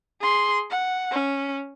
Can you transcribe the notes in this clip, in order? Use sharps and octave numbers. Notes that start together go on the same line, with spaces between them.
G#4 C6
F#5
C#4